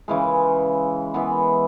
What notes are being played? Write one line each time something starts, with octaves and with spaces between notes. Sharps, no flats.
C#3 E3 G#3
E3 G#3 B3